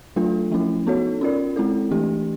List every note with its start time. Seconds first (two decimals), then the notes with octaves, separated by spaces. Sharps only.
0.16 F#3 A3 D4 F4 A4
0.51 F3 A3 C#4 E4
0.87 B3 D#4 F#4 A4 C#5
1.21 C#4 F4 A#4 D5
1.56 G#3 C4 E4 A4
1.91 E3 A3 D4 G4